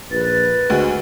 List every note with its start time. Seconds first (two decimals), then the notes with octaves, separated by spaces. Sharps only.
0.11 A#1 B4 A6
0.70 D2 G#3 F#4